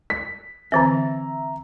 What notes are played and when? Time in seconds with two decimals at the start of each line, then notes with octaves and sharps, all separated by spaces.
0.10 B6
0.72 D3 E3 C4 E5 A#5